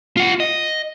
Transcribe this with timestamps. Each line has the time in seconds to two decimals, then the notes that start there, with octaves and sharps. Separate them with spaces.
0.17 F4 F#5
0.40 D#5